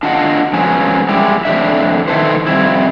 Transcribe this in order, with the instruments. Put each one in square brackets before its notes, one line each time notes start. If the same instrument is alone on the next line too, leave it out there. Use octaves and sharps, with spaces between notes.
[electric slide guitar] D4 F4 F#4 D#5 F#5
F3 F#3 G#3 B3 C#4
G3 G#3 E4 G4
F2 A2 C3 D4 E5
D#3 E4 A4 B4 C5
F2 G3 C4 E4